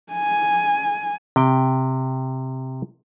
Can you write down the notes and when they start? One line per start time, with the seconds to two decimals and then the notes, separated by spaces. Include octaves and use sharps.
0.13 G#5
1.36 C3 G5